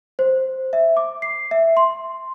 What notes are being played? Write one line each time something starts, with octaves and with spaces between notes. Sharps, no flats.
C5
E5
D6
C7
E5
C6